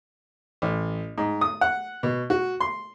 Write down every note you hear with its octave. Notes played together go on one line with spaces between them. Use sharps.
A1
G#2
D#6
F#5
B2
F#4
C6